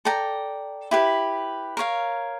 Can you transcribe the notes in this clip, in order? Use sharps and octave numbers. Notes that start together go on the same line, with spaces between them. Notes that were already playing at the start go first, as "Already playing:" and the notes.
A4 D5 G5 A#5
E4 G4 B4
A#4 C#5 F5